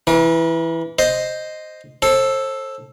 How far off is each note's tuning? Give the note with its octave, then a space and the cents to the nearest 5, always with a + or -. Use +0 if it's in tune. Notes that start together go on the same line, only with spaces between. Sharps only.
E3 +0 A#4 +45
C5 +0 D#5 +0
A4 +0 C5 +35